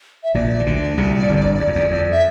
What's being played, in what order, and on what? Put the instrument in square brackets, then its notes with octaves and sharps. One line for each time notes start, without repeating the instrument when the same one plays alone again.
[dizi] E5
[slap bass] A#1 A#2 [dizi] D5
[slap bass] E3
D2 D3
C2 C3
A2
G1 G2
E2
F2
E2
F2
[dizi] E5